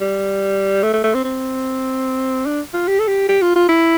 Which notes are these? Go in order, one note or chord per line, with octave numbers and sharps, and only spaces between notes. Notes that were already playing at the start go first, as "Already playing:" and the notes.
G3
A3
A3
A3
C4
C4
D4
F4
G4
A4
G4
G4
F4
F4
E4